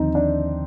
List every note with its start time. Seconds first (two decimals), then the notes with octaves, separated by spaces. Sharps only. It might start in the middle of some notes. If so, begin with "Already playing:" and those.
Already playing: D#2 D3 F3 C4 D#4
0.15 D4